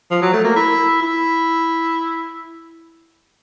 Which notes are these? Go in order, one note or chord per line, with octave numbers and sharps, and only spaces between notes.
F3
F#3
A3
A#3
E4
E4